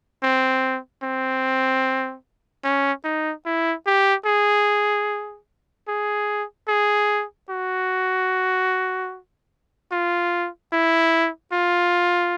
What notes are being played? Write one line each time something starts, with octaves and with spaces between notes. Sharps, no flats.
C4
C4
C#4
D#4
E4
G4
G#4
G#4
G#4
F#4
F4
E4
F4